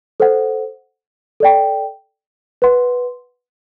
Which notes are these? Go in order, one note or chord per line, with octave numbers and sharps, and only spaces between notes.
A4 C5 F#5
A4 D5 G5
B4 F#5 C6